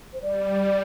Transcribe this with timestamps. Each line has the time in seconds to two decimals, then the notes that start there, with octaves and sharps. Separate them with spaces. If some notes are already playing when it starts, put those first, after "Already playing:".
0.13 C5
0.21 G3 D5